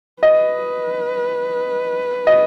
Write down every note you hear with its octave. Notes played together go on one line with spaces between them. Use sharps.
B4 D#5
D#5